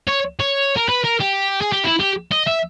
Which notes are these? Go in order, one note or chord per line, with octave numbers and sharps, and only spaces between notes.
C#5
C#5
A#4
B4
A#4
G4
G#4
G4
E4
G4
D#5
E5